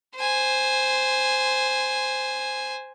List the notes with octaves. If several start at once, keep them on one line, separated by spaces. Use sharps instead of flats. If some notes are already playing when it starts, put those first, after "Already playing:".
C5 G#5